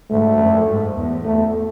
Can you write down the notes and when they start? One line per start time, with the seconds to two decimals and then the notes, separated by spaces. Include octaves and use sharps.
0.10 G#2 A3
0.39 F#2
0.68 G#2
0.96 E2
1.24 A3